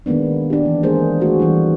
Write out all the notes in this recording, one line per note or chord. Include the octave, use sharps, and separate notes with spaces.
D#3 G#3 A#3 B3 D4
D4 G4
E3
G#3 A#3 G#4 A#4 C5
G#3 A3 F#4 G#4 C5
D#3 E3 G3 D4